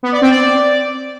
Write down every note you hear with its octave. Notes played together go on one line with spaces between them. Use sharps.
B3
D5
C4
D5